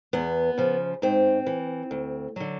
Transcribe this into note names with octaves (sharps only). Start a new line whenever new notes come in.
E2 B3
C#3 F3
G#2 C4
E3
D2
D3 F#3